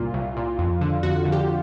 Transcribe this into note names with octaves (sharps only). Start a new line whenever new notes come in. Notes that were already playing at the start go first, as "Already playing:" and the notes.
Already playing: C2 A#2 F4
C2
A#2
F2
D3
F2 F#4
D3
G4